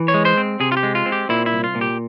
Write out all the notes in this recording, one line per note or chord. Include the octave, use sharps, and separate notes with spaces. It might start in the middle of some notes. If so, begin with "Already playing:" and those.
Already playing: E3
C#5
G#3
C5
C4
C3 G#4
F4
G4
G#3
F4
C4
G4
A#2 E4
E4
C2
F4
A#2
G4